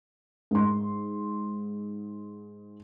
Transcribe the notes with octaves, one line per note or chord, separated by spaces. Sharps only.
G#2 C6